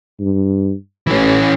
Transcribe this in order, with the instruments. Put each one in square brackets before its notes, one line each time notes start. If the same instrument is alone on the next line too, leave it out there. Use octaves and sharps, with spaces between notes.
[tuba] G2
[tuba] A1 [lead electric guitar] E3 C#4